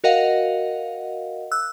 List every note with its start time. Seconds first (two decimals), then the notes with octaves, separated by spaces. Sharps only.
0.04 F#4 A#4 D#5 F5 F#5
1.52 E6 F#6